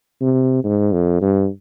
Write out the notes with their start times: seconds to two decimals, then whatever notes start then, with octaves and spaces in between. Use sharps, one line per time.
0.21 C3
0.64 G#2
0.93 F2
1.21 G2